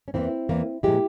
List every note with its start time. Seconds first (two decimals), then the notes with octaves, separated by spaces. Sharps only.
0.08 C#4
0.14 E2 E3 A#3 C4 E4
0.49 E2 E3 A#3
0.83 A#2 F3 G#3 E4 G4